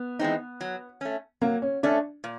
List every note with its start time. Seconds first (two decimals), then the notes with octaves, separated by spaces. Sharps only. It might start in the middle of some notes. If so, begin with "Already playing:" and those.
Already playing: B3
0.19 E3 G#3 C4 D#4
0.61 F#3
1.01 A3 C#4
1.41 F#3 A#3
1.62 C#4
1.83 A3 C#4 D4
2.24 A#2